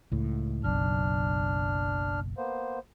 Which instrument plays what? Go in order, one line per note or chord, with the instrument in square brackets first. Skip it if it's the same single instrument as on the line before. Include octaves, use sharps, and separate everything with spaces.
[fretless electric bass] C#2 A2
[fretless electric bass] F#1 B1 [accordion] D4 F6
[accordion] A#3 B3 C5